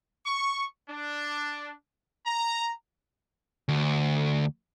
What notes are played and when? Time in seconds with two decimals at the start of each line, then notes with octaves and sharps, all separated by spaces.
0.25 C#6
0.89 D4
2.26 A#5
3.68 D2